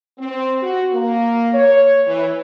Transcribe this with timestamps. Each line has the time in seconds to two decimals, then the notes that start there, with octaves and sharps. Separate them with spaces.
0.18 C4
0.62 F#4
0.92 A#3
1.53 C#5
2.07 E3